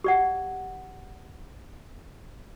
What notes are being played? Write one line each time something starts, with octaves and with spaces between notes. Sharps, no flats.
G4 D5 F#5